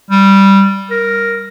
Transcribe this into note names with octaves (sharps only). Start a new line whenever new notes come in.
G3
A#4